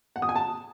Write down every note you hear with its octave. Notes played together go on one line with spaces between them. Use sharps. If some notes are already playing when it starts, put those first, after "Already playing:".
F#5
D#6
G#5
A5